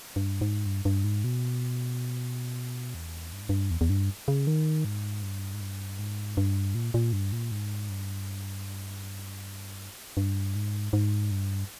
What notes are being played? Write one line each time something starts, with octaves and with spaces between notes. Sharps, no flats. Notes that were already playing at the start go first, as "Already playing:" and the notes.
G2
G#2
G2
G2
G#2
B2
E2
G2
G#2
G2
E2
E2
G2
C#3
D#3
G#2
G2
G#2
G2
G#2
G2
A#2
A#2
G2
A#2
G#2
G2
G2
G#2
G#2
G2